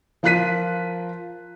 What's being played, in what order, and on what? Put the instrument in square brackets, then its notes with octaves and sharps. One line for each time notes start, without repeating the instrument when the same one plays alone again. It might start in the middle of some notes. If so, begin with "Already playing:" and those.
[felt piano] F3 F4 A#4 F#6 B6 D#7